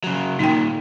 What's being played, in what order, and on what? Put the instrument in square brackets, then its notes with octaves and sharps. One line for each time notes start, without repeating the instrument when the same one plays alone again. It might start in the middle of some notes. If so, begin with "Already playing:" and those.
[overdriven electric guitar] C#3 F#3
[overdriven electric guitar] A#2 D#3 [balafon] D#4 G5